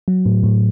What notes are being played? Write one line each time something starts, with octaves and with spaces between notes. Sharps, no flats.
F#3
A2
A2